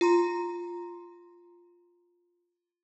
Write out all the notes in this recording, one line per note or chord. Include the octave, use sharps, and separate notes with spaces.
F4 A#5 C6